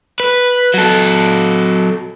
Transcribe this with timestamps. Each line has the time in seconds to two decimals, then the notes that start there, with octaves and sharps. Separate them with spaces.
0.20 B4
0.74 F#3 A4